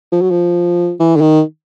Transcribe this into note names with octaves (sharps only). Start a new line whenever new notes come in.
F3
F#3
F3
E3
D3
D#3